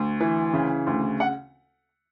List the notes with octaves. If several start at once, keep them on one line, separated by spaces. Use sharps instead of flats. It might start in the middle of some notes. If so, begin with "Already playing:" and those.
Already playing: D2
E3
C#3
D2
F#5